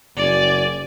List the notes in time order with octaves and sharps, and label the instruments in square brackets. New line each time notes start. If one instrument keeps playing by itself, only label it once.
[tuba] F#1 [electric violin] D5 G#5